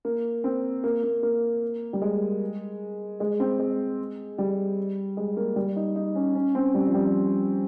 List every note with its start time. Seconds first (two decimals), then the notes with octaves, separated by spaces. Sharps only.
0.05 A#3
0.44 C4
0.84 A#3
1.03 A#3
1.23 A#3
1.93 G3
2.02 G#3
3.20 G#3
3.40 C4
3.59 G#3
4.38 G3
5.17 G#3
5.37 A#3
5.56 G3
5.76 D#4
5.96 D#4
6.15 C#4
6.35 C#4
6.55 C4
6.74 G3
6.88 F3
6.94 G3